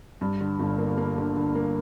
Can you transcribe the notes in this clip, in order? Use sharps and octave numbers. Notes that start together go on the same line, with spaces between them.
G2
D3
G1
A#3
A#3
D3
D3
A#3